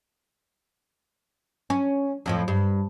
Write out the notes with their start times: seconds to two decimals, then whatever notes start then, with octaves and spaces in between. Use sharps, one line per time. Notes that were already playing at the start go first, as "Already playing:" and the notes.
1.70 C#4
2.26 F2 A2 F3
2.48 G2